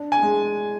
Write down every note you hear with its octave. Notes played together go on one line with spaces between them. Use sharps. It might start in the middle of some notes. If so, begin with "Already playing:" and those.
Already playing: D4
G#5
G#3